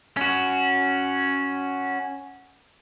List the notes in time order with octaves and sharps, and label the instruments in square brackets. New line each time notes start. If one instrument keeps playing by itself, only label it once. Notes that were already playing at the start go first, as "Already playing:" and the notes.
[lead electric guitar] C#4 F#4